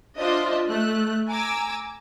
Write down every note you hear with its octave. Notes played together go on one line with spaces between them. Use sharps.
D4 F4 C5 D#5 E5
A3 F#6
G#5 A#5 D6 E6